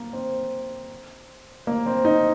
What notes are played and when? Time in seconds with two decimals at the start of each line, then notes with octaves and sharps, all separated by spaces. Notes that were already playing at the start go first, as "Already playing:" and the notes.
Already playing: A#3
0.13 C4
1.67 A#3
1.86 C4
2.05 D#4